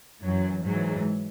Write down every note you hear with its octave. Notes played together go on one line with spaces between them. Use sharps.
F#2 E3 F#3
G#2 E3 F#3